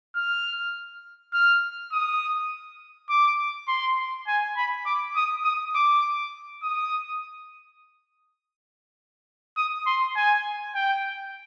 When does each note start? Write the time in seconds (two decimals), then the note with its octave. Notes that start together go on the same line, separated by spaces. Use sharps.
0.16 F6
1.33 F6
1.92 D#6
3.10 D6
3.68 C6
4.28 G#5
4.57 B5
4.86 D6
5.16 D#6
5.45 D#6
5.75 D6
6.63 D#6
9.57 D#6
9.87 C6
10.16 G#5
10.75 G5